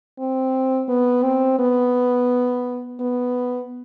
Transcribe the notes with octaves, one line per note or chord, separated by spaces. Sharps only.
C4
B3
C4
B3
B3